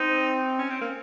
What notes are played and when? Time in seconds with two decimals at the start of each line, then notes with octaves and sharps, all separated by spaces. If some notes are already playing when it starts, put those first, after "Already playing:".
Already playing: C4 D#4
0.59 C#4
0.70 C4
0.81 A#3